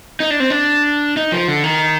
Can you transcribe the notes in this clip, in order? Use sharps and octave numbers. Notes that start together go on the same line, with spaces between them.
D#4
D4
C4
D4
D#4
F3
D3
D#3